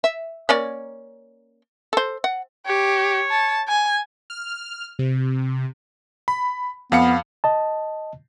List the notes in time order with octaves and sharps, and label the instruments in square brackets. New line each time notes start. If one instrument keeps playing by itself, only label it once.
[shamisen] E5
A#3 C#4 D5
A4 C5
F#5
[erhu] G4 [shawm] C#5
[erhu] A5
G#5
[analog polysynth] F6
C3
[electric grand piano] B5
[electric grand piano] F2 F5 C#7 [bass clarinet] B3
[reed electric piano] D#5 A5